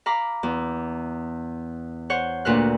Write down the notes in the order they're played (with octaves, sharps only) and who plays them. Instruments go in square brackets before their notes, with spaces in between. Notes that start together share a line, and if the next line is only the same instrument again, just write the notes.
[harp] F5 A#5 B5 D6
E2
C5 C#5 F#5
D2 A#2 B4 F5 F#6